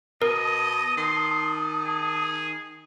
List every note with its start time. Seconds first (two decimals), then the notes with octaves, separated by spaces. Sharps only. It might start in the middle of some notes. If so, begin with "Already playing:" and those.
0.22 B2 A#4 D#5 A5 D#6
0.97 D#3 C6
1.85 G#4